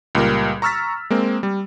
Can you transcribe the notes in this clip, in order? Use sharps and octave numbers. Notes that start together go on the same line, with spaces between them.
C#2 A#2 G3 A#4
A#5 C#6 E6 F6 A6 B6
G#3 A#3 C4
G3